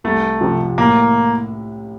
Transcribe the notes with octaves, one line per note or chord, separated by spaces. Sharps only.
C2 A3
C3 F3
A2 A#3